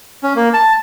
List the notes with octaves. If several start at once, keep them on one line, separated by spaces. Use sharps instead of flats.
C#4
A#3
A5